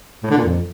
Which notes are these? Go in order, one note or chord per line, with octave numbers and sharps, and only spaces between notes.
A2
D3
A#2
F2